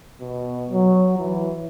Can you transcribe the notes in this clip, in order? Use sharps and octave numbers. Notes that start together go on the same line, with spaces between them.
B2
F#3
E3